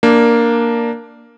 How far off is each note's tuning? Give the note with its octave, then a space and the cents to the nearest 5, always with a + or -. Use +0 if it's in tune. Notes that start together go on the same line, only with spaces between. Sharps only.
A#3 +0 D4 +5